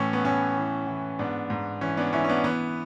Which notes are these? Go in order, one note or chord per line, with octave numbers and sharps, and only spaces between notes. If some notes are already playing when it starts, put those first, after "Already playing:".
Already playing: A2 E3 C#4
B3
A2 C#4
E3
E3
G#2 B3 D4
G#2
E3 C#4
B3 D4
E3 C#4 E4
C#4
B3 D4
E3 B3